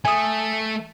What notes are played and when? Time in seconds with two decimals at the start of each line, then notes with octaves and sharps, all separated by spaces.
0.05 A3 G#5 D#6